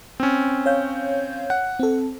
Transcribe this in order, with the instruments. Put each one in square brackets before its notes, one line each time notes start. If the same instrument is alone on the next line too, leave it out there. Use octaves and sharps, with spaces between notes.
[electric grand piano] C4 C#4
[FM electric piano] C#5 F5 G6
[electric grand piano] F#5
[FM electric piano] C4 A4